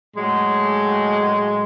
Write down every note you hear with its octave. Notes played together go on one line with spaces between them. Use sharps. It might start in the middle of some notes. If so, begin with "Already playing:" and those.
A2 F#3 G#3